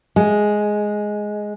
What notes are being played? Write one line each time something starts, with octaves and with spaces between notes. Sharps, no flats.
G#3